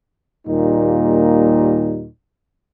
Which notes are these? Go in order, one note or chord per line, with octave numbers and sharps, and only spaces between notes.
D#2 A#2 G3 A#3 D#4